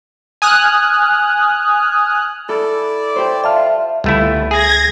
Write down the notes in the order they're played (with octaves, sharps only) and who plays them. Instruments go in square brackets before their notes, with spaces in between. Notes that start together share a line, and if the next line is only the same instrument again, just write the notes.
[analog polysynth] G#5 D#6 F6 F#6
[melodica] E4 D5 [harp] A4
[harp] G4 C5
[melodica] F4 [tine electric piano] D5 A5 F6 [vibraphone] E5
[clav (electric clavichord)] G1 A3 E4 [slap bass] C#2
[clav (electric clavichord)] G#4 [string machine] G#6 A#6